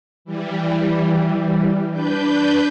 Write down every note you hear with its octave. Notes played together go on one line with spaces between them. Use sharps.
E3 G3
D4 B4 G6